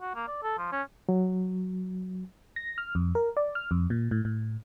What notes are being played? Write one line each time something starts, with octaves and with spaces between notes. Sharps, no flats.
F#4
A#3
D5
A4
F3
C#4
F#3
A#6
F6
F2
A#4
D5
F6
F2
A#2
A2
A2